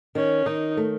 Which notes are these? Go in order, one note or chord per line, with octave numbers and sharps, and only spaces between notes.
D#3 C#4
D#3 D#4
A3